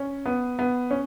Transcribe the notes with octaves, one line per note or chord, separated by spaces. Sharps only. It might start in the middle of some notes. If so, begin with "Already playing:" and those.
Already playing: C#4
B3
B3
C#4